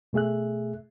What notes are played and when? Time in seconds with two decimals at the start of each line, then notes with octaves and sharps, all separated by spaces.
0.13 B2 A3 G#4 E5 F#6